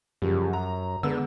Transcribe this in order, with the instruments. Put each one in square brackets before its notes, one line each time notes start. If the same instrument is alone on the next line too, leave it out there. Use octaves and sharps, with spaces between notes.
[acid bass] F#2 [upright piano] C#3 F3 G3
[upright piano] A#5
[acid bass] D3 [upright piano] G#3 B3 E6